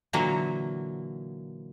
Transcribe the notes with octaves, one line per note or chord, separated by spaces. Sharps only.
A#2 D3 E3 F#3 A#3